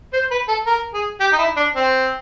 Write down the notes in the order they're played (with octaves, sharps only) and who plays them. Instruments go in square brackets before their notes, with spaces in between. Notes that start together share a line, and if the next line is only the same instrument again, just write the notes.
[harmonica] C5
B4
A4
A#4
G#4
G4
D#4
E4
D4
C4